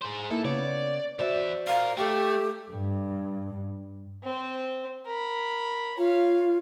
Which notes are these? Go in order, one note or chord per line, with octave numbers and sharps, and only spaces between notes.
G#4 C5
A#3 D#4 E4 A4
C#3 B3 C#5 D5
E2 F#4 C5 D5 E5
A#2 A#4 F5
A3 G4 A4 E5 G5
G2
C4 C5
A#4 B5
F4 C#5 F5